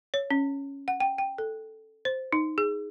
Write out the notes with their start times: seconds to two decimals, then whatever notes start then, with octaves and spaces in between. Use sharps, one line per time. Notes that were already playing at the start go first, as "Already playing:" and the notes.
0.14 C#5
0.30 C#4
0.88 F#5
1.00 G5
1.18 G5
1.38 A4
2.05 C5
2.33 D#4
2.58 G#4